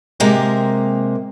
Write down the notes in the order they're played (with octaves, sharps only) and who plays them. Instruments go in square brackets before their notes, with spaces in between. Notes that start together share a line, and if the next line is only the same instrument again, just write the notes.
[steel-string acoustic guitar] C3 G#3 A#3 G4 A#4